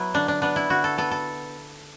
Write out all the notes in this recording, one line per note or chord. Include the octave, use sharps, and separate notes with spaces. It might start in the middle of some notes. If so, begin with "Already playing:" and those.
Already playing: F#3 B3 E4
D3 D4
D4
B3 D4
E4
D3 F#4
A4
B3 A4
A4